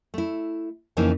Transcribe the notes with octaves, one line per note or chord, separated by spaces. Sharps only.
A3 E4
F2 C#3 E3 A#3 D#4